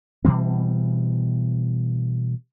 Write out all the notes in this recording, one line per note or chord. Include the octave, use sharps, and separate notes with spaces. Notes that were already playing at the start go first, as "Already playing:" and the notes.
B2 E3 G3 C4